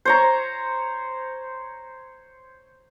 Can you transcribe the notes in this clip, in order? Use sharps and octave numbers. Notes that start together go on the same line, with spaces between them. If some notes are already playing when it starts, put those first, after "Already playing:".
C5 C#5 A#5